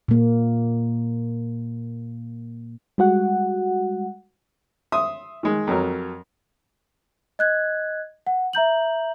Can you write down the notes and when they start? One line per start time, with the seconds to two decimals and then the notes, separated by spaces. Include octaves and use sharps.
0.08 A#2 A#3
2.98 G3 G#3 F#4 F#5
4.92 E5 C6 D#6
5.43 D#3 G#3
5.67 F2 F#3 A#4
7.39 D#5 F#6 G#6
8.27 F#5
8.53 E5 A#5 G6 F#7